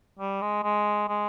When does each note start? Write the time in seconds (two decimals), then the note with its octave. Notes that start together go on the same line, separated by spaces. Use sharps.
0.19 G3
0.42 G#3
0.63 G#3
1.08 G#3